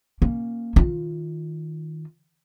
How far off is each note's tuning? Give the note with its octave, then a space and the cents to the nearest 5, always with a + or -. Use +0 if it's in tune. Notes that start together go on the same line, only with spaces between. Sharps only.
A#3 +0 C#4 -15
D#3 +20 F4 +0